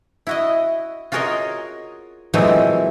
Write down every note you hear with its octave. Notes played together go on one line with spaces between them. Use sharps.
E4 F#4 D#5
F4 F#4 G#4 A#4 C#5 D#5
A#2 E3 F#3 G#3 A3 C4